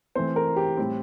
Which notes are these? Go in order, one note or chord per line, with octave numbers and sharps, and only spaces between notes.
E3 A3 C4 C5
A#4
G4
A2 G3 C4